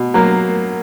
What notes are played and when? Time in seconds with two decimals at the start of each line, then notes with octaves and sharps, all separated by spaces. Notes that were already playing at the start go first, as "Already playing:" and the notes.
Already playing: B2
0.14 F#3 A#3